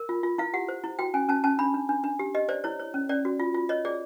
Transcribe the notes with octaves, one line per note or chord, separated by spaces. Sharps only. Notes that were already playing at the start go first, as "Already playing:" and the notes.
Already playing: A#4
F4
F4
E4 F5
G4 F#5
C5
E4
F#4 G5
C#4 G#5
C#4 A5
C#4 A5
D4 B5
D4
D4
D4
G4
G4 D#5
C5 D5
E4 C#5
C#5
C#4
C#4 D5
F#4
F4
F4
C#5 D#5
G#4 D5